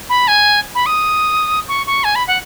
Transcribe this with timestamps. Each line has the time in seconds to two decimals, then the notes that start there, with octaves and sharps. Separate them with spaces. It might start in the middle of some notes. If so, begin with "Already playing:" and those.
0.10 B5
0.28 G#5
0.75 B5
0.86 D#6
1.68 C#6
1.87 C#6
2.04 G#5
2.15 B5
2.28 F#5